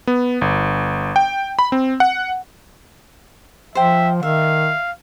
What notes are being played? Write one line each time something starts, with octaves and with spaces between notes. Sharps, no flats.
B3
G1
G5
B5
C4
F#5
F3 C5 E5 G5
D#3 E5 F5